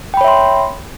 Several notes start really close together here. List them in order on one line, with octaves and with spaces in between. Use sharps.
G5 B5 C#5 E5 C6